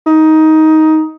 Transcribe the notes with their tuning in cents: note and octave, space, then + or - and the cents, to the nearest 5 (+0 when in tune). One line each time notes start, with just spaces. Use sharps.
D#4 +15